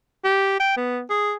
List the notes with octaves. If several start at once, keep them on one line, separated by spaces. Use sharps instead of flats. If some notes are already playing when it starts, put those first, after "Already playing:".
G4
G5
B3
G#4